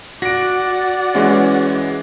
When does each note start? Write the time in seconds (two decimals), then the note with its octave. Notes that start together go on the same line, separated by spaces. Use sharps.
0.22 F#4 D5 F#5 A#6 D7
1.15 E3 G#3 C#4